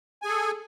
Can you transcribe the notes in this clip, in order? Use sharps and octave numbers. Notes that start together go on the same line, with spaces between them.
G#4 A4 G#5